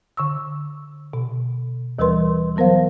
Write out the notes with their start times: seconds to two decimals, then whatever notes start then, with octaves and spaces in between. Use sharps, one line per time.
0.17 D3 C#6 E6
1.13 B2
1.99 D#2 E3 G3 A#4 B4 C6
2.56 E3 F#3 B3 A#4 C5 F5